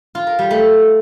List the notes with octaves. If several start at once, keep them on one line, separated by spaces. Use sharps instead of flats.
F4
A#4
G3
A3